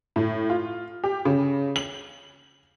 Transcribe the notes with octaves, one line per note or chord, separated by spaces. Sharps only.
A2
F4
G4
C#3
F#7